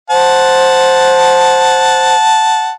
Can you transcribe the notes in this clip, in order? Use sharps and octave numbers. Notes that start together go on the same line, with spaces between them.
C5 F#5 A5